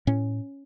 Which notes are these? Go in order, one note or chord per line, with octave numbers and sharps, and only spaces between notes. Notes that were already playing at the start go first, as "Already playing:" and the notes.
A2 C#4